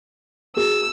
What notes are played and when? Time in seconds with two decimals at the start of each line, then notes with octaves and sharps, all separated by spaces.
0.57 F#4 G#4 E6